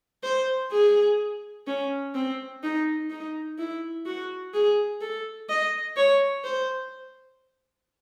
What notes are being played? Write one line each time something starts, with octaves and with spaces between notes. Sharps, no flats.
C5
G#4
C#4
C4
D#4
D#4
E4
F#4
G#4
A4
D#5
C#5
C5